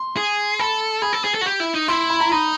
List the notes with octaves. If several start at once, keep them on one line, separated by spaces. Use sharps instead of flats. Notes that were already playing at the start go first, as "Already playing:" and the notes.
Already playing: C6
G#4
A4 B5
G#4 B5
A4
G#4
A4
F#4
G4
E4
D#4
E4 C6
B5
A#5
D#4 B5